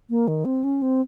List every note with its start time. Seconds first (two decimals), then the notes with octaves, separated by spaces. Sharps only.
0.10 A#3
0.28 D#3
0.45 C4
0.64 C#4
0.82 C4